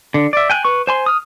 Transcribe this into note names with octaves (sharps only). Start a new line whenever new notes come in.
D3
D5 E5
G5 G#5 F#6
B4 C#6
C5 G#5 C6
D#6 F6